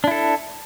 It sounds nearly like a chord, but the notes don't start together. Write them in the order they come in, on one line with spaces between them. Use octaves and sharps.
D4 E4 A4